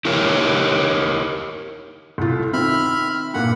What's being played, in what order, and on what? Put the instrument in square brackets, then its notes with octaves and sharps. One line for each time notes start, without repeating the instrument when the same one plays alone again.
[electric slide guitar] E4 G4 A#4 C#5
[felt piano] C2 A2 F4
[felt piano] D#3 C4 [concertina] E5 B5 F6
[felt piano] G2 A#2 [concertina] F#5 B5